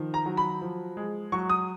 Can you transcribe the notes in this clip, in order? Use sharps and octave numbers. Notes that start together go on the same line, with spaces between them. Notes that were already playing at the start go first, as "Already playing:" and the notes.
Already playing: D#3 F3
A#5
F#3
B5
F3
G#3
F#3 C#6
D#6